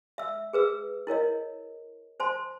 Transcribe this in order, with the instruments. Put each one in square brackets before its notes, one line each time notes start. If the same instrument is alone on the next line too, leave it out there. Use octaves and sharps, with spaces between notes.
[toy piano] E5 E6
G#4 B4 E6
E4 A#4 C#5 D#5
C5 A5 C6